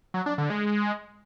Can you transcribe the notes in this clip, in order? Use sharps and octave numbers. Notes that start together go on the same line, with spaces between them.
F#3
D4
D3
G#3